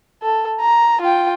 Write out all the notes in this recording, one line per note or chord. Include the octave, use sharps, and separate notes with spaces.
A4
A#5
F4 G5